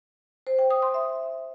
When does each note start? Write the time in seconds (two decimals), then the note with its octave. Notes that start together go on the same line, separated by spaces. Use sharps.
0.47 C5
0.59 G5
0.70 D#6
0.82 C6
0.94 E5